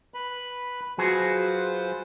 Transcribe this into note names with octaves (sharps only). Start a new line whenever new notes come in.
B4 B5
F#3 F4 F#4 G#4 B4 C5